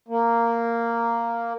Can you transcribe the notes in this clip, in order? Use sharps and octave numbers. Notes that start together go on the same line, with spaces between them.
A#3